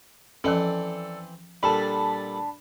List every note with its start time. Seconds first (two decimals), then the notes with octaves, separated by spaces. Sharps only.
0.44 E3 F3 C4 C#4 A4 D5
1.63 A#2 G3 D4 A4 A5 B5